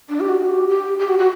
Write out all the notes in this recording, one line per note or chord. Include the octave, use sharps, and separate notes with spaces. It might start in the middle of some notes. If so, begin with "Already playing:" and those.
D4
G4
F#4
G4
G4
G4
F#4
F#4